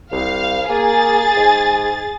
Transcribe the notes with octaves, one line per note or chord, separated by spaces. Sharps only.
C2 F5
A#3 G#4 A6
G#2